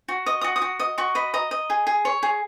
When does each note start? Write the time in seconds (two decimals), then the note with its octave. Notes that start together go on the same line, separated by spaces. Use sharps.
0.08 F#4
0.26 D#5 D#6
0.41 D#6
0.44 F#4
0.56 D#6
0.62 F#4
0.79 D#5 D#6
0.98 F#4 C#6
1.15 D#5 B5
1.34 D#5 A#5
1.51 D#5
1.70 G#4
1.87 G#4
2.05 C#5
2.23 G#4